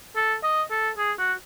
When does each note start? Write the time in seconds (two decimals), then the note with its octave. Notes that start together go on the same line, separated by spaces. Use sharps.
0.16 A4
0.44 D#5
0.71 A4
0.98 G#4
1.19 F#4